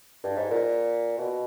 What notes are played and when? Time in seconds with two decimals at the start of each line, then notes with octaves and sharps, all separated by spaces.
0.23 G2
0.36 G#2
0.50 A#2
1.18 B2